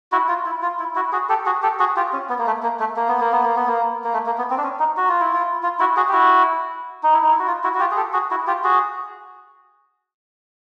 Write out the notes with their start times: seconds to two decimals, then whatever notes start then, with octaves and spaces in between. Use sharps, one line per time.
0.12 E4 F#4
0.28 F4
0.46 E4
0.62 F4
0.79 E4
0.95 E4 F#4
1.12 F#4 G#4
1.29 G4 A4
1.46 F#4 G#4
1.62 G4 A4
1.79 F#4 G#4
1.96 F4 G4
2.13 C#4
2.29 B3
2.39 A#3
2.46 A3
2.63 A#3
2.80 A3
2.96 A#3
3.08 B3
3.20 A#3
3.32 B3
3.43 A#3
3.56 B3
3.68 A#3
4.04 A#3
4.13 A3
4.26 A#3
4.38 B3
4.50 C4
4.58 D4
4.64 C#4
4.79 D#4
4.97 F#4
5.09 F4
5.21 E4
5.33 F4
5.63 F4
5.79 E4 F#4
5.97 F#4 G#4
6.08 G4
6.13 E4 F#4
7.03 D#4
7.14 E4
7.22 D#4
7.31 E4
7.39 F#4
7.47 F4
7.64 E4 F#4
7.74 F#4
7.80 F4 G4
7.91 G#4
7.97 G4 A4
8.13 F#4 G#4
8.31 E4 F#4
8.47 F4 G4
8.64 F#4 G#4